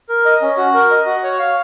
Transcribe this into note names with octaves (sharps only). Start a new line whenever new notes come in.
A#4
D#5
C#4
F#4
A#4
D#5
F#4
C#5
F5